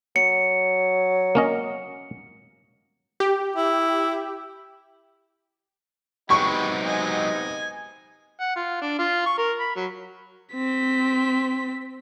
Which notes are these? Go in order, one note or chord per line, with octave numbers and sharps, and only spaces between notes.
F#3 C#7
A#3 C#4 D#5
G4
E4
C3 F#3 G#3 B3 D#4 G4 B5 C#6
D#5 G#5
F#5
F4
D4
F4
C#6
A#4
B5
F#3
C4 B6